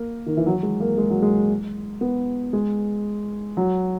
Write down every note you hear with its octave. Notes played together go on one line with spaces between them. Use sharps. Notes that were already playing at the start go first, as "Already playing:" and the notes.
Already playing: A#3
D#3
E3
F#3
G#3
A#3
G#3
F#3
G#3
B3
G#3
F#3